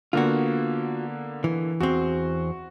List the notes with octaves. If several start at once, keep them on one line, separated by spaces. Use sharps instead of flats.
D3 A#3 B3 F4 F#4
E3
E2 C4 F#4